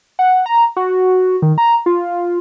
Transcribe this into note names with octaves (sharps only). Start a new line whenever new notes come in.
F#5
A#5
F#4
D#3
A#5
F4